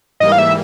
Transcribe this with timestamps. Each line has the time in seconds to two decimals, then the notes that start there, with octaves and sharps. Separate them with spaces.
0.20 G#2 E3 G3 A#3 D#5
0.32 F5
0.39 E5